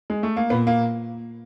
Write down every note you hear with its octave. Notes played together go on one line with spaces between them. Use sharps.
G#3
A3
A#3
A#2 B3
A#3